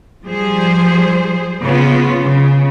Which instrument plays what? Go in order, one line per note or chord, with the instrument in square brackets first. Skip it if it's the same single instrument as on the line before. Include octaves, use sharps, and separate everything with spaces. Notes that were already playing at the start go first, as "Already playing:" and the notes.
[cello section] F3 G3 G#4 C5
C#3 B3 F4
C#3